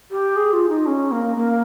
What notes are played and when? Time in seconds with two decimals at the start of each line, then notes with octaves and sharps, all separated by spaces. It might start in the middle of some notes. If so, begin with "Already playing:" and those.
0.10 G4
0.36 G#4
0.52 F4
0.68 D#4
0.86 C#4
1.11 A#3
1.36 A#3